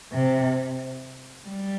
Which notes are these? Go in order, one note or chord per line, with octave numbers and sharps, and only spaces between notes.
C3
G3